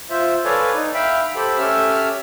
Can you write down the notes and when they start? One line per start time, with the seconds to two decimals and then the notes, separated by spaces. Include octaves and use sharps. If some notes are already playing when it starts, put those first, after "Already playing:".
0.10 F4 C5 E5
0.45 A4 B4 C#5 D5 F5 G#5
0.75 D#4
0.94 E5 F5 G5 B5
1.35 G4 A4 C5 B5
1.58 C#4 G4 A4 E5 E6 F6